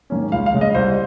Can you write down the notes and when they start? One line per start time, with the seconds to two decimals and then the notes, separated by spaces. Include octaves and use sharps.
0.10 G#2 D#3 A#3 C#4
0.32 C#2 F5
0.46 F5
0.54 C#3 G#3
0.61 D#5
0.75 C2 C5